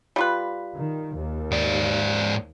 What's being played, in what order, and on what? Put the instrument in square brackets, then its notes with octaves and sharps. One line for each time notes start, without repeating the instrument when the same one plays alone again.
[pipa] G3 F4 B4
[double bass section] D#3
D#2
[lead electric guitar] G#2 D5